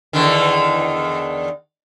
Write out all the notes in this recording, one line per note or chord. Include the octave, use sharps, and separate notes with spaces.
E2 D3 D#3